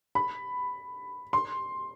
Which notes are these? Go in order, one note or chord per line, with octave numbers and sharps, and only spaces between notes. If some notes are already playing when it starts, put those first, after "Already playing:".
B5
C6